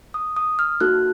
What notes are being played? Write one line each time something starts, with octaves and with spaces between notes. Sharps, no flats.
D#6
D#6
F6
A#3 D#4 F#4 A4 F#6